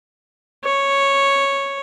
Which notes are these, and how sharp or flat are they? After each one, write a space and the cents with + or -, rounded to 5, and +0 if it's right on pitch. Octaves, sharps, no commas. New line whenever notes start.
C#5 -5